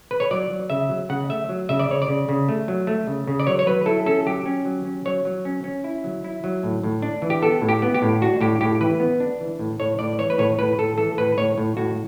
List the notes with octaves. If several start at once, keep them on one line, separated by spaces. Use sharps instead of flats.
B4
C#5
F#3 D5
F#3
C#3 E5
F#3
C#3 F#5
A3 E5
F#3
C#3 E5
D5
C#3 C#5
D5
C#3
C#3
A3
F#3
A3
C#3
C#3
D5
F#3 C#5
C#5
F#3 B4
E4 A4
C#4 A4
F#3 G4
C#4
F#3
C#4
F#3 C#5
F#3
C#4
C#4
E4
F#3
E4
F#3
A2
A2
D4
E3
G4
B3 A4
A2
G4
B3
G4
A2
D4 F#4
A2 G4
A2 G4
E3 B4
B3
D4
E3
A2
A2 C#5
A2 D5
E3 C#5
B4
A2 C#5
A2 B4
A2 A4
E3 A4
A2 B4
A2 C#5
A2
A2 F#4